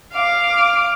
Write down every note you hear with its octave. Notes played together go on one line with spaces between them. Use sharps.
F5 D6